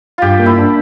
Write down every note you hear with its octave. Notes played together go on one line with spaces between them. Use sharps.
G2 F4 G4
A#3
E4
D4